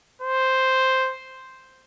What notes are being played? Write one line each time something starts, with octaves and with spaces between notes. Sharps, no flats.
C5